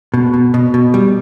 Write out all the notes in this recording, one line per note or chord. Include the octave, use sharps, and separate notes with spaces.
B2
B2
B2
B2
G3